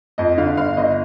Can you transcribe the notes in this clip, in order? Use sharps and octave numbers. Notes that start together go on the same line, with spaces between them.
F2 D#5
D3 F5
G1 F5
G1 D#5